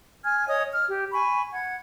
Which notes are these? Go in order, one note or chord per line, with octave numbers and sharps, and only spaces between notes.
G#5 F6 G#6
C#5 D#5 D#6
F6
G4
G#5 B5 C#6
F#5 G#6